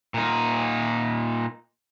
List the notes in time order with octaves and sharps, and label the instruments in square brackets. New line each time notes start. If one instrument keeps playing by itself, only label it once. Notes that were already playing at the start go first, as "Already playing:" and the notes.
[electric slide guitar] A#2 D#4